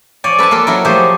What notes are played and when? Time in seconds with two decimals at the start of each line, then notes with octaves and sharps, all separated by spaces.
0.24 F3 C#5 D5 G#5
0.39 A4 B4 G#5 A5
0.51 A#3 F4 A4 B4
0.67 F#3 E4 A#4
0.85 F3 F#3 A3 G4 G#4 C5